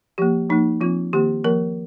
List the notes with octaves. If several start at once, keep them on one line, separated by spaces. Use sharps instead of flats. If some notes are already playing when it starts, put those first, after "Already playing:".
F3 A#3 G4
F3 A#3 D#4
F3 C4 F4
D#3 A#3 G4
F3 A#3 A#4